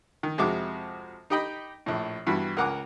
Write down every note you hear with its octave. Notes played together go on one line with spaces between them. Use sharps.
D#3
F2 C3 G#3 F#4 D6
D#4 G4 D#5 G5 B5
A#1 A2
G2 E3 B3 F#4
C#2 A#4 F#5 G#5 D6